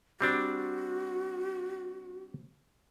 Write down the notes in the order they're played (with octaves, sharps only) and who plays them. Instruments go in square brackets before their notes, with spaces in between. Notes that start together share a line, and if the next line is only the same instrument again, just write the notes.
[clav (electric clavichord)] G3 C4 D4 [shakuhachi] F#4